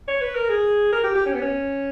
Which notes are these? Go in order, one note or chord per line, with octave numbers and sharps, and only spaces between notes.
C#5
B4
A#4
G#4
A#4
G4
G4
C#4
B3
C#4